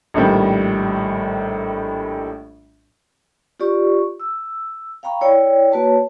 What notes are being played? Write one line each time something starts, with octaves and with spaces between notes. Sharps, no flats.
A#1 A2 D#3 G3
F4 G4 D5 C#6
E6
F5 G5 A#5 B5 C#6
E4 C#5 D5 G5
A#3 F#4 B4 C#5 A5